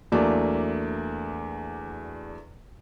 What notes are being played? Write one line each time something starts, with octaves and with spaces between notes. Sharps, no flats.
E2 F#3 A3 A#3 D4